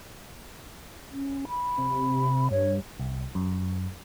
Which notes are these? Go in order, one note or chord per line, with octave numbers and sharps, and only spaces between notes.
C#4
B5
C3
G2 C#5
C2
F#2